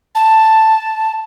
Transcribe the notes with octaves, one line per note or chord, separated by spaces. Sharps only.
A5